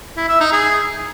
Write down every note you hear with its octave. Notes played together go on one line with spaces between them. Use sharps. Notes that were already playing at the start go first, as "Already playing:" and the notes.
E4
E5
D#4
G#4